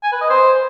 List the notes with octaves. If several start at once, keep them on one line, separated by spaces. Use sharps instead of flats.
G#5
B4
D#5
C5